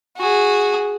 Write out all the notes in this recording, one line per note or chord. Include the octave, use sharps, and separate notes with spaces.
F#4 G#4